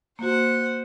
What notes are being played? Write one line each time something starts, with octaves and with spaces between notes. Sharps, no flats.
A#3 F#4 C5 F#5